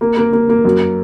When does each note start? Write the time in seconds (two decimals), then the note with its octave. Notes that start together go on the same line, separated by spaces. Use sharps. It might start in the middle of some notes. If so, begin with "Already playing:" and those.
0.01 A#3
0.17 A#3
0.33 A#3
0.49 A#3
0.65 F#2